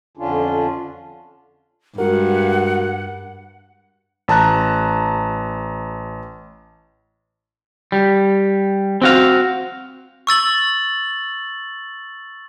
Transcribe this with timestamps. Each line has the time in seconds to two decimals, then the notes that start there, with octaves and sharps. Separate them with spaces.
0.17 F2 D3 C#4 D4 F4
1.98 G2 G#3 F#4 A#4 F#5
4.28 A1 A5 A#5 F#6
7.92 G3
9.02 C4 F#4 F5
10.27 C#6 E6 A6 F#7